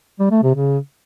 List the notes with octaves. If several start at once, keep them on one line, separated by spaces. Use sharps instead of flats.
G3
A3
C3
C#3